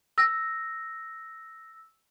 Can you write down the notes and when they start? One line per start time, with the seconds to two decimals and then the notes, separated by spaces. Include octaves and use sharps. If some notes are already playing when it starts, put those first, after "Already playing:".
0.18 E6 A#6